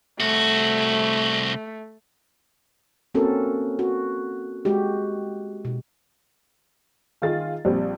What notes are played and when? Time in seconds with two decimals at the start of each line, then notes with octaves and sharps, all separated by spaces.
0.20 C2 A3 F#4
3.14 A#3 C4 C#4 F#4 A4 A#4
3.79 F#4
4.65 G#3 F#4 G4
5.65 B2
7.22 D#3 F4 G#4 A6
7.65 A#1 G3 C4